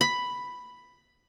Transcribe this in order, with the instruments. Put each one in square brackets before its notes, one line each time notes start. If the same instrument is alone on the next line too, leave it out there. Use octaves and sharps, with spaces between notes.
[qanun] B5